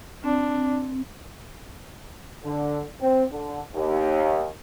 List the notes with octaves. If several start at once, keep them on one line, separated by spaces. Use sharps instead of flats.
C4 D4
D3
C4
D3
D#2